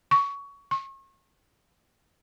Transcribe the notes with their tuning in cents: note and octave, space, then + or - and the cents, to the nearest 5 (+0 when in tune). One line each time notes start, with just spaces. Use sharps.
C#6 +20
C#6 -35